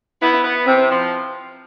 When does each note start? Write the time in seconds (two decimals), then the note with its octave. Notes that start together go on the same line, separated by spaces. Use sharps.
0.22 B3 E4
0.44 B3
0.66 C3 C4
0.90 F3